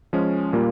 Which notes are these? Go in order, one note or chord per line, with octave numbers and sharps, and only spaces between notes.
F3 G#3 C#4
A#2 G3 A#3 F4